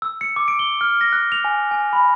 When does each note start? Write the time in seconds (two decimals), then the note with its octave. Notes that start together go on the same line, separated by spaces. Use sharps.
0.02 E6
0.21 C#7
0.36 D6
0.48 D7
0.59 G7
0.81 F6
1.01 A#6
1.13 F#6
1.32 F7
1.44 G#5
1.71 G#5
1.93 B5